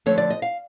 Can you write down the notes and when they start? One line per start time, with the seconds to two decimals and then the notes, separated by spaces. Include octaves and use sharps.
0.06 D3 F3 A3 C4 C#5
0.18 D5
0.30 D#5
0.42 F5